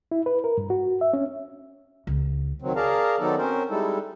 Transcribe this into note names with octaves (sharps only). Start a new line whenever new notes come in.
E4
B4
A#4
G2
F#4
E5
C#4
C#2
D#3 F#3 C4
G#4 A#4 D5 F5 A5 A#5
D#3 F#3 B3 D#4 A4 D5
C4 C#4 A#4 C5
G3 G#3 D#4 E4 A4